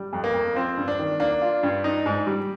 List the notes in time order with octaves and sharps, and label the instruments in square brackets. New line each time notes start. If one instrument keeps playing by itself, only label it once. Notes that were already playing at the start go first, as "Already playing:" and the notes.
Already playing: [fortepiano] G3
F2
[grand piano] A#3
[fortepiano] F2
[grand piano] C4 [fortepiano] F4
[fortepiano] G2
[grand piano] D4
[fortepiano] D#3
[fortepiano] A#3 [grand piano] D4
[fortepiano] F4
G2
D#4
G#2
G3